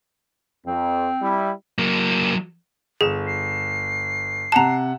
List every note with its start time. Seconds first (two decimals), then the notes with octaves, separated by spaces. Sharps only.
0.66 F2 C4
1.20 G3 E4
1.78 F#3 A#3
3.01 G1 G#4 E7
3.27 C7
4.52 C3 F#5 A5 A#5 E7